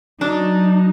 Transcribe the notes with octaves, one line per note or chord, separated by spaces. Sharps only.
F#3 D4 D#4